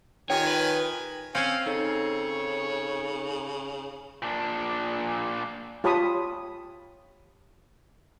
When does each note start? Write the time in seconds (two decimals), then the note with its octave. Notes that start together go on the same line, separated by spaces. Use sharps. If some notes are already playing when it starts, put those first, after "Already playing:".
0.30 D#3 F4 G4 C#5 G5 G#5
0.47 B4
1.35 C4 C#4 F5 G#5 F6
1.66 C#3 D#4 A4 C#5
4.22 A#2 D4
5.84 F4 G4 C#5 A5 B5 D#6